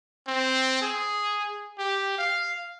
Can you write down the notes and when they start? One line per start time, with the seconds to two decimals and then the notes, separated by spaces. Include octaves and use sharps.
0.27 C4
0.82 G#4
1.78 G4
2.19 F5